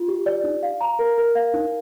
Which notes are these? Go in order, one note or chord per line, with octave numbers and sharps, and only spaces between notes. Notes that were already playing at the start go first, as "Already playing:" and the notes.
Already playing: F4
G4
D5
D#4
F5
A#5
A#4
A#4
F5
D#4